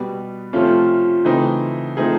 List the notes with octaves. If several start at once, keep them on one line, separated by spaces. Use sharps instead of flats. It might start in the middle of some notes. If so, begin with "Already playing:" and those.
Already playing: B2 G3 B3
C3 F3 A3 C#4 F4
C#3 E3 A3 C4 D#4
F3 A3 C4 D#4 G#4